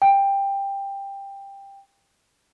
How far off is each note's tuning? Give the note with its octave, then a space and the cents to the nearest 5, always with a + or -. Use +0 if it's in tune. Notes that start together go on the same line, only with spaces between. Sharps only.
G5 +15